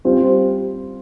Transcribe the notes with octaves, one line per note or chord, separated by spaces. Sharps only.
G3 C4 F4 C5